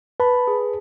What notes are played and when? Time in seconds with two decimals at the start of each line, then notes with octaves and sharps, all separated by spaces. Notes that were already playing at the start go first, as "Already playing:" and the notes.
0.20 B4 A5 B5
0.47 G#4